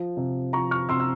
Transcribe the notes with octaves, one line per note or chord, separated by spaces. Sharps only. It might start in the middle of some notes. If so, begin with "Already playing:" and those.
Already playing: F3
C3
F3 A#5 C#6
C#6 F6
C3 C6 E6
E6